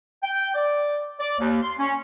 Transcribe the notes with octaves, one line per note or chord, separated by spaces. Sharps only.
G5
D5
D5
D#2
C6
C#4